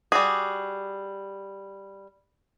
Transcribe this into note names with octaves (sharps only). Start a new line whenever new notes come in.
G3 F#4 G#4